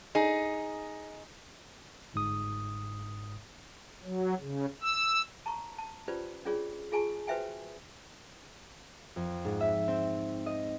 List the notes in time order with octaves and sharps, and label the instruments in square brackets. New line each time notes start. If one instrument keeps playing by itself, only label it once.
[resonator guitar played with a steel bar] D#4 G#4
[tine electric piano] G1 G#2 D#6
[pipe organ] F#3
C#3
E6
[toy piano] A5 A#5 C#6
A5
C#4 F4 G4 B4 C5 D5
C#4 D4 F4 G#4 C#5 D5
F4 G#4 G#5 A5 C#6
F#4 B4 C5 E5 G5 G#5
[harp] F2
G#2
E5
C4
D#5